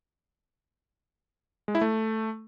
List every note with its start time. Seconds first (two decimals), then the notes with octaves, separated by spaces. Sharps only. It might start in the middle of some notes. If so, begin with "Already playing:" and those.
1.68 G#3
1.75 E4
1.81 A3